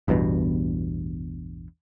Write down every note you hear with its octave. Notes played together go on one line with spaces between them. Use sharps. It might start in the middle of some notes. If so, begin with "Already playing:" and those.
A1 E2 G2 B2